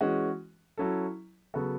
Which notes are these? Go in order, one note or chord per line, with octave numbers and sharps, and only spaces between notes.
E3 G#3 C#4 F#4
F#3 C#4 E4 A4
C#3 F#3 B3 F#4 A4